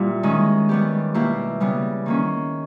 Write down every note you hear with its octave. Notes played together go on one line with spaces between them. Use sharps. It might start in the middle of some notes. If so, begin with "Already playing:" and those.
Already playing: A#2 G3 E4 G4
D#3 G#3 C#4
G3 B3 G4
B2 A#3 E4 G4
C#3 G3 B3
D#3 A#3 C#4